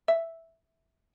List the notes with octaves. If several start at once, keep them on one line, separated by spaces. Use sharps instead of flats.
E5